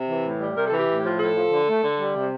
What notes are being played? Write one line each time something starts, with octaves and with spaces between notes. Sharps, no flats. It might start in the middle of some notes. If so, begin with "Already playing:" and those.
Already playing: C3
E3
A2
G3
C3 A#4
A4
E3
G4
A2
F3
A2 A4
F3
D3
A3
D3
G3
C3